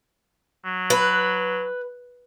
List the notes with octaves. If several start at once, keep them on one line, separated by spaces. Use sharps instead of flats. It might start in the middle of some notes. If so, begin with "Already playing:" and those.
F#3
B4